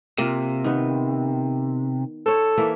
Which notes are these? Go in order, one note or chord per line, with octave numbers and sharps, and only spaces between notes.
C3 A#3 F4
D#3 B3
A4 C5 C#5
E3 A#3 E5